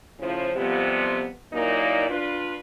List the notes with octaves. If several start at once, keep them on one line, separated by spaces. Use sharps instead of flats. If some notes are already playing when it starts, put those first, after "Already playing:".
A2 C#3 F3
F2 C3 F3 G3 B3
A#2 F#3 A#3 D#4 E4 D5
D4 F4 B4